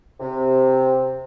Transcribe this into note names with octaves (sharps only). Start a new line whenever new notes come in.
C3